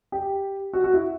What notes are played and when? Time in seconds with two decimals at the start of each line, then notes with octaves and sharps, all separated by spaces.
0.12 G4
0.73 F#4
0.84 F#4
0.94 E4